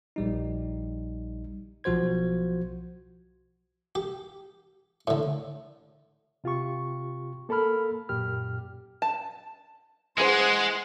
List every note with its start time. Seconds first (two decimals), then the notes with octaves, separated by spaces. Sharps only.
0.16 A#1 G3 D#4
1.84 B1 F3 F#4 C5 G#6
3.95 G4
5.07 A2 D3
6.44 C3 F4 G4 C#6
7.49 A#3 A4 A#4 B5 F6
8.09 F#2 A#2 G4 F6
9.02 A5
10.18 E3 G#3 G#4 C5 F#5 C6